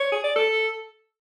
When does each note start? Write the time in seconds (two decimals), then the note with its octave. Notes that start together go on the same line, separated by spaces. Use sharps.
0.01 C#5
0.12 G#4
0.24 D5
0.36 A4